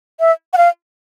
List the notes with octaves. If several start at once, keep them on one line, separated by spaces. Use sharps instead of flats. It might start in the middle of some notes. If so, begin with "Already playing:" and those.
E5
F#5
F5